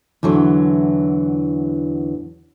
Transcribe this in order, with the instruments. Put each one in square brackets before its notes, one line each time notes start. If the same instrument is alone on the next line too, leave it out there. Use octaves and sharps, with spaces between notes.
[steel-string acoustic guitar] E2 D3 E3 F#3